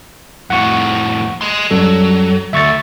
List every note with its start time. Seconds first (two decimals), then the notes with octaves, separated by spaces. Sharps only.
0.50 F2 A2 F#5 C#6
1.41 D#5 C6
1.71 F#2 F#3 G3 A4
2.53 D2 E5 C#6 A6